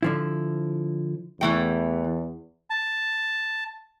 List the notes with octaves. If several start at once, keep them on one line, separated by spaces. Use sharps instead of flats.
D3 F3 E4
E2 E3 A3 G5
A5